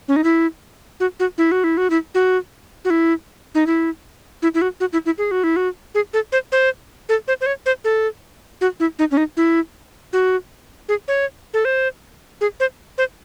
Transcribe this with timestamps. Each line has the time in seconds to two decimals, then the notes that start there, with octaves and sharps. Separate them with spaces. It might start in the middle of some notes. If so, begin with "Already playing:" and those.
0.08 C#4
0.16 D#4
0.24 E4
1.00 F#4
1.20 F#4
1.38 E4
1.52 F#4
1.64 E4
1.77 F#4
1.90 E4
2.15 F#4
2.85 F#4
2.90 E4
3.55 D#4
3.67 E4
4.42 E4
4.54 E4
4.62 F#4
4.80 F#4
4.93 E4
5.06 E4
5.18 G#4
5.31 F#4
5.44 E4
5.56 F#4
5.95 G#4
6.13 A4
6.32 C5
6.52 C5
7.09 A4
7.28 C5
7.41 C5
7.46 C#5
7.66 C5
7.84 A4
8.61 F#4
8.80 E4
8.99 D#4
9.11 C#4
9.17 D#4
9.37 E4
10.13 F#4
10.89 G#4
11.08 C#5
11.54 A4
11.65 C5
12.41 G#4
12.60 C5
12.98 C5